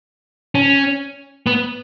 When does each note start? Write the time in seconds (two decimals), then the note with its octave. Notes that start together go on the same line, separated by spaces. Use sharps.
0.55 C#4
1.46 B3